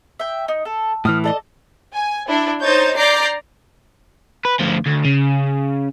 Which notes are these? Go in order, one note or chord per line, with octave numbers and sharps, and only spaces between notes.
E5 G5
D#4
A4
A2 E3 D#6 F6
A4 D5 D#5
G#5
D4 E4
D#4 C5 C#5 G6 A6
D5 A#5 D6 G6 C7 D7
B4
D2 F3
D2
C#3